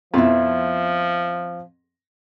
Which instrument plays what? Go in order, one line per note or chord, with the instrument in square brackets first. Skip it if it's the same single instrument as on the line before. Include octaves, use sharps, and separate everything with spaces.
[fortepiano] F2 B2 [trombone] F3 [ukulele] E4 F4